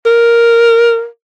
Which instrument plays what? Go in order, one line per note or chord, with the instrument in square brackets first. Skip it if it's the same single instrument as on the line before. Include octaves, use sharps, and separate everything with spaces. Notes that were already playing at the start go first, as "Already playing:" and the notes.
[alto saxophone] A#4